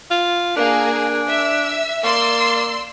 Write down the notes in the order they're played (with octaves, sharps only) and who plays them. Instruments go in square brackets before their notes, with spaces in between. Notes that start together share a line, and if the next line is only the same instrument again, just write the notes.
[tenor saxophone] F4
[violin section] A#3 G#4 [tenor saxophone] D4
[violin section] E5 E6
[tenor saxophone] A#3 [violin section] D5 C6 E6